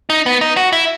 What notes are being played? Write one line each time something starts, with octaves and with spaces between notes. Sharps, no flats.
D#4
B3
D#4
F#4
E4